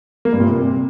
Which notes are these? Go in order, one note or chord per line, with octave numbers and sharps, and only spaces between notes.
A#3
G2
A#2
C3